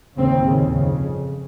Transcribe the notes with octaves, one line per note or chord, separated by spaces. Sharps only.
D#2 C#3 C4
D#2 C#3
F2 C#3